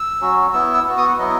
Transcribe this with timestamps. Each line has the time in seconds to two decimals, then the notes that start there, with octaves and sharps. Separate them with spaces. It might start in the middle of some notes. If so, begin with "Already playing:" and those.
Already playing: E6
0.21 F#3 C#4 F#4
0.53 B3 E4 E6
0.74 E6
0.87 B3 F#4
0.98 D#6
1.08 F#5
1.18 F#3 B3 E4 D#5